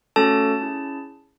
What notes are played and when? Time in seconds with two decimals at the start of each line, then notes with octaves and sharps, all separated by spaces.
0.16 A3 C#4 F#4 A4 A5
0.61 C#4 E4 G#4